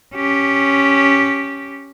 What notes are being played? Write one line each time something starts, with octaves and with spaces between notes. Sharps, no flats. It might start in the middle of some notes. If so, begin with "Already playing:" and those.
C#4 G4